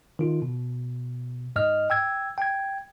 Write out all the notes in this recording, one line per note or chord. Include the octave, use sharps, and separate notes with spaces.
D#3 F4
B2
G#2 D#5 F6
G5 E6 G#6
G5 G#6